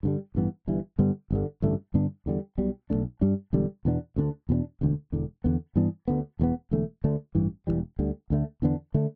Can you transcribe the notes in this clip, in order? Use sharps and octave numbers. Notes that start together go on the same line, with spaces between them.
G2 D3 G3
A1 G2 E3 B3
G1 G2 E3
G2 D3 G3 B3
G1 G2 D3
A1 G2 D3 A3
G2 D3 B3 D4
E2 D3 G3
B1 B2 G3
B1 A2 A3 D4
G2 G3 D4
E1 E2 D3 G3
E2 B2 B3 D4
D2 D3 B3 D4
E2 B2 B3 D4
E1 D2 D3
E1 E2 D3
E2 D3 B3
G2 E3 B3 D4
D2 D3 B3
E1 E2 E3 B3
E1 E2 D3 A3
D2 D3 A3 D4
A1 G2 E3
E1 E2 E3 G3
D2 D3 G3
D2 D3 A3
E2 D3 B3 D4
D3 A3 D4